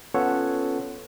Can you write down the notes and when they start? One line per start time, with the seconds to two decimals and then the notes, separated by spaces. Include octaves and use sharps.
0.14 B3 C#4 F4 A4 C#5 F#5